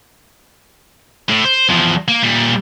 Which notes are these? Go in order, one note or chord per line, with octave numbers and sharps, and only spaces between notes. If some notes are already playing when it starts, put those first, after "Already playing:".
A2
C5
E2 F3
A#3
A#2 G3